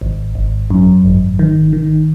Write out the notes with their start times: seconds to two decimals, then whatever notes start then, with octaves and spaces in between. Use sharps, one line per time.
0.01 G#1
0.35 G#1
0.70 F#2
1.04 G#1
1.39 D#3
1.73 D#3